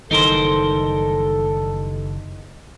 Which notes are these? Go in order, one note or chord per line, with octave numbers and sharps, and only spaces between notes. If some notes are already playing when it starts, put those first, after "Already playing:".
F#1 D#3 E3 G3 D#4 A4 A#4 C5